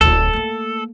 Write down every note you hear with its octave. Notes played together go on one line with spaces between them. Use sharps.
D1 D#4 A4
A3 A#3